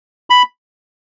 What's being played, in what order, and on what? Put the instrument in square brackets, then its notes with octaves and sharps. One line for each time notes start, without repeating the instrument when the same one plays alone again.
[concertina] B5